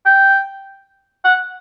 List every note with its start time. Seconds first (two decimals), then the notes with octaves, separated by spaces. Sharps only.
0.06 G5
1.25 F#5